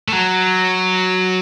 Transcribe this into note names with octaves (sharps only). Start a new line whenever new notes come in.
A3
F#3